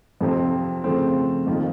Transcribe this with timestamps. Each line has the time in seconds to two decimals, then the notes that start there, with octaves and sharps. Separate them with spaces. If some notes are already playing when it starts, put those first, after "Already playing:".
0.21 F2 C3 F3 C4
0.84 C#3 F3 A3 C4
1.47 F2 D#3 A#3 F4